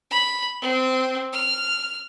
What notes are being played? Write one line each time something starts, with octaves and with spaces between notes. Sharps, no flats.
B5
C4
F6